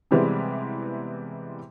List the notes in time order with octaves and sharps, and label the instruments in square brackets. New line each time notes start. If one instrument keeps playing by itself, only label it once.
[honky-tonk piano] C3 E3 G3 G#3 B3 C4